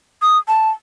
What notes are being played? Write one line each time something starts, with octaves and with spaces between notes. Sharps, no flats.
D#6
A5